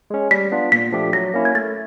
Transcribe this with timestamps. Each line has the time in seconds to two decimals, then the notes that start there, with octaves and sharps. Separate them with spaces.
0.10 G#3 C#4
0.31 G3 B6
0.52 B3 D4 F4
0.72 A#2 B6
0.92 F3 A3 D4 G4
1.13 F#3 A#6
1.34 A#3 C#4 E4
1.45 G#6
1.55 A3 A6